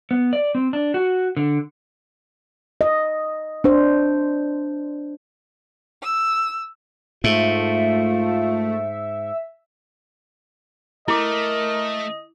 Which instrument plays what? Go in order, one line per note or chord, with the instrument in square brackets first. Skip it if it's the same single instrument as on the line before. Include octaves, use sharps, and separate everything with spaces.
[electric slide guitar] B3
D5
C4
D4
F#4
D3
[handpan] D#5
D4 C5
[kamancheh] E6
[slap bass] G#2 [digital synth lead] A3 [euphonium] F4 [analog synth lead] E5
[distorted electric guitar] A3 [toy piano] E4 D6 [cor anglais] A#4 [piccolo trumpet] D#5